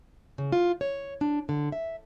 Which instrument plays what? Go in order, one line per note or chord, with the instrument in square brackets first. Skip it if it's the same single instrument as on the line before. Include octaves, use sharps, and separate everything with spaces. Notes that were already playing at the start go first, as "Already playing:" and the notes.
[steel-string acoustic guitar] C#3
F4
C#5
D4
D3
E5